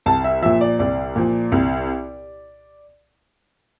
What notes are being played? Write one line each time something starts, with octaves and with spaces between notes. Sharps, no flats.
C2 A5
E5
A#2 F3 E5
D5
C2 D5
A#2 F3
C2